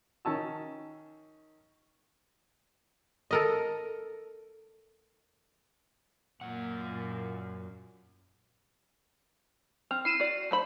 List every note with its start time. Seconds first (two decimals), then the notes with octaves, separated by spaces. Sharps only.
0.25 D#3 C#4 A5 E6
3.31 A4 A#4 D#5
6.41 F#2 A#2 F#5
9.91 C4 F6
10.05 E4 C7 D#7 E7
10.20 F#4 D5
10.51 A3 C5 B5